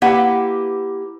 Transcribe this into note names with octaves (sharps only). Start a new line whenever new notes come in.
A#3 E4 G4 B4 F#5